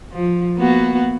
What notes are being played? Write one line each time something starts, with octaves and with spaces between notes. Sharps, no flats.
F3
A#3 B3 F#4